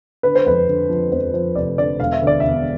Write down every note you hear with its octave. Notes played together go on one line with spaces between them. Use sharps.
D3 B4
C5
F2 B4
D3
F3
F2 C5
F3 C5
F1 D5
D3 D5
E1 F5
E5
D2
D5
E1 E5